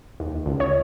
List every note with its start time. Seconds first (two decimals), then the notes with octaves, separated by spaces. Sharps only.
0.20 D#2
0.46 C#2
0.60 C#5